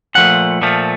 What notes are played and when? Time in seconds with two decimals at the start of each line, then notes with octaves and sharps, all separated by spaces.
0.15 A#2 F3 A3 F#5
0.62 A#2 F3 A3